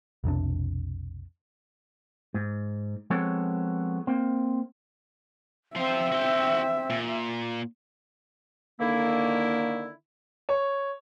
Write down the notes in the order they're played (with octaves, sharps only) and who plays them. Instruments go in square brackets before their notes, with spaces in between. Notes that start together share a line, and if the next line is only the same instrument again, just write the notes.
[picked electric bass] B1 F2 C3 D4
[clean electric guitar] G#2
F3 G#3 B3 C4 A4 C#5
A#3 C4
[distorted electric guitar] F3 C5 [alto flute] C4 [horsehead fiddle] E5
[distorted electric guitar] F#4 G5
A#2
[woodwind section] D3 D#3 A#3 E4
[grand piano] C#5